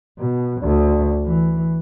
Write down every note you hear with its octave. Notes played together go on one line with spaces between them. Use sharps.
B2
D2
E3